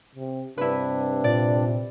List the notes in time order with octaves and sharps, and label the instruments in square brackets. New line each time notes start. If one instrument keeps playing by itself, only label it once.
[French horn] C3
[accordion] G2 D4 [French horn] C3 [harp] E4 B4
[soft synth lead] A#2 [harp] D5